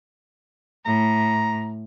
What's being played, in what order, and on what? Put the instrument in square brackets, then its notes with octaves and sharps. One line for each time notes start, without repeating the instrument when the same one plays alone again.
[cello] A2 [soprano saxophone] A#5